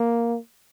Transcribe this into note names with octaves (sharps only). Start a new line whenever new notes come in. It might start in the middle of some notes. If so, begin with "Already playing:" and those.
Already playing: A#3